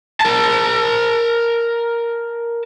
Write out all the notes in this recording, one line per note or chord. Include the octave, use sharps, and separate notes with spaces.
A#4 A5